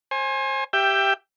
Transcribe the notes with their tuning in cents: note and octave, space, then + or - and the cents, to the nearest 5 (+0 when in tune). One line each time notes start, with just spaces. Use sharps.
C5 +35 G#5 +0
G4 +0 E5 +15 G5 +10